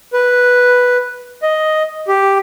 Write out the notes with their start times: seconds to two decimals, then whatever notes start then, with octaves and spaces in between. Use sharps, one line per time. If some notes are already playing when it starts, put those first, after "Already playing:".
0.13 B4
1.43 D#5
2.08 G4